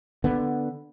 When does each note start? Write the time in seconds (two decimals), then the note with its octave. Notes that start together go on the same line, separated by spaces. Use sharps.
0.24 D3 B3